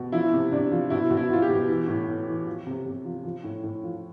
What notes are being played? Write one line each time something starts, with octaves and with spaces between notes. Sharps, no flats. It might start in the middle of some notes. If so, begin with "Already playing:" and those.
Already playing: B2
F3 E4
C3
C3 D4
F3
B2 E4
B2
E4
B2 F4
G4
B2
E3
A2
A2
E3
F3
C3
C3
F3
F3
A2
A2
F3